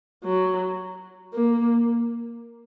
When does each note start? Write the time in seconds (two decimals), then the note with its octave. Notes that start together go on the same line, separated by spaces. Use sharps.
0.24 F#3
1.34 A#3